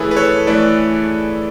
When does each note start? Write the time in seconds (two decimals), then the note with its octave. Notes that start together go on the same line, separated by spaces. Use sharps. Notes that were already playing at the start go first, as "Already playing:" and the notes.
Already playing: E3 A3 E4 G#4 A4 B4 C#5
0.11 B4
0.16 A4 C#5
0.47 E3 A3 E4 B4 D5